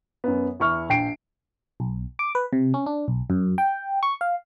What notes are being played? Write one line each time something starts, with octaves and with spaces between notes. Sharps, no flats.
F#2 B3
E2 E4 C#6 F6
A#1 G5 C7 D7
B1
D6
B4
C3
C#4
D4
B1
F#2
G5
C#6
F5